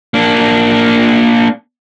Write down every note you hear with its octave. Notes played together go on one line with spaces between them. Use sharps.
A#3 D4